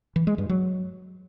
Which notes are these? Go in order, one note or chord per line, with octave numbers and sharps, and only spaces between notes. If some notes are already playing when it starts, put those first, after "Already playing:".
E3
G#3
G2
F#3